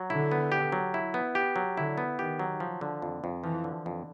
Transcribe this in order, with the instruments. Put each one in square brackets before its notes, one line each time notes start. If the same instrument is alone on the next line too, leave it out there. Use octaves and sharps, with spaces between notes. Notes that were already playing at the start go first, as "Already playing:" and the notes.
Already playing: [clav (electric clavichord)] F#3
[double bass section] D3 [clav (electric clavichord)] E4
[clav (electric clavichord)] B3
G4
F#3
E4
B3
G4
F#3
[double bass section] D3 [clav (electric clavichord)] E4
[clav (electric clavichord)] B3
[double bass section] D#3 [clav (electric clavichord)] G4
[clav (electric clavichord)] F#3
F3
D3
F2
F2
[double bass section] E3 [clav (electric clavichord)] F3
[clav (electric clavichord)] D3
F2